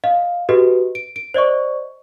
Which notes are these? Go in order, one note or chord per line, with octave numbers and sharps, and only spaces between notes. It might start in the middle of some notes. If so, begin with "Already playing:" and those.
D#5 F5
F#4 G4 A4 B4 D#5
D7
D7
C5 D5 D#5 C#6